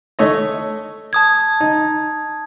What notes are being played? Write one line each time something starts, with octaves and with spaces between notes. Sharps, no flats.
A3 C#5 D#5
A5 D#6 G#6
D#4